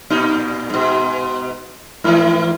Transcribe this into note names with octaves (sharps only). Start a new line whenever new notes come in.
A#2 D#4
G#2 B2
G#2 E3